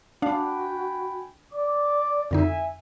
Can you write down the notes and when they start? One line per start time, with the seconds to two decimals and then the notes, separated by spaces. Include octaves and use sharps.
0.22 D4 F#4 F5 G5 G#5 B5
1.53 D5 D6
2.31 F2 D3 D#4 E5 G#5